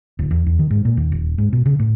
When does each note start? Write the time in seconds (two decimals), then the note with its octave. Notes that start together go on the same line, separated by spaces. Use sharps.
0.19 D1
0.31 E2
0.47 E2
0.59 D#3
0.70 G#2
0.85 A#2
0.97 D#2
1.12 D#1
1.38 G#2
1.53 B2
1.66 C#3
1.79 A2